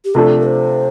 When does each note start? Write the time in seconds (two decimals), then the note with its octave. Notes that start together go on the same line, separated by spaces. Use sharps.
0.05 G4
0.14 C3 F3 A3 D4 A4
0.46 C5